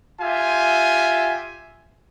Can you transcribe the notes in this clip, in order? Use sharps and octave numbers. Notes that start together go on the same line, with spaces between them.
F4 G4 E5 G#5